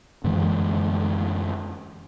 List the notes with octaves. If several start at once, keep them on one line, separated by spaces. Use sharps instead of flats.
F#2 D3 E3 G#3